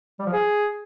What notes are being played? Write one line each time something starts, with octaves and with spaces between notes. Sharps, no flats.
G3
F3
G#4